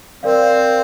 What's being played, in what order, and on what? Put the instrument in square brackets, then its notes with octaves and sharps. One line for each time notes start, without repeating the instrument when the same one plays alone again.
[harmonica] C4 [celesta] A#4 D5 F5